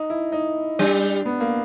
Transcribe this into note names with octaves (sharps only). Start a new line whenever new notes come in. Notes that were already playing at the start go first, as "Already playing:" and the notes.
Already playing: D#4
E4
D#4
G3 D4
B3
A#3